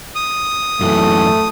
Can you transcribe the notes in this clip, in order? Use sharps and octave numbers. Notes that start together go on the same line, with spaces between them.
D#6
F#2 E3 A3